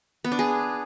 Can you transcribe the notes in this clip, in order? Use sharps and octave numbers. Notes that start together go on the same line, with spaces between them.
B3
D4
G#4